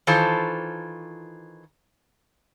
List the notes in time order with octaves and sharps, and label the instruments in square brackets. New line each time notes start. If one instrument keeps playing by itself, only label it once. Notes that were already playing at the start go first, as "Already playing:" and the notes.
[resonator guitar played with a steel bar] D#3 E3 F4 A4 C5